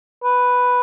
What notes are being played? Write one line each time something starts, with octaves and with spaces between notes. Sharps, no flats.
B4